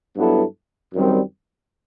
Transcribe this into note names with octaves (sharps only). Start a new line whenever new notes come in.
G2 F#3 B3 E4 A4
F#2 D#3 G3 C4